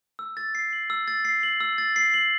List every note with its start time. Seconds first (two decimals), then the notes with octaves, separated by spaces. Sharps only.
0.19 E6
0.37 A6
0.55 C7
0.73 F#7
0.90 E6
1.08 A6
1.25 C7
1.43 F#7
1.60 E6
1.78 A6
1.96 C7
2.14 F#7